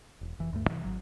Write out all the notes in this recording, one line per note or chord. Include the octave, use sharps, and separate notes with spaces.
E1
F1 E3
D2 G2 A3
C3 D#3 E3
G#1 F#3